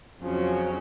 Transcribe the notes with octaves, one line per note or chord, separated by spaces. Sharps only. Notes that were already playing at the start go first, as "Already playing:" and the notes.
F2 C#3 F3 F#3 C#4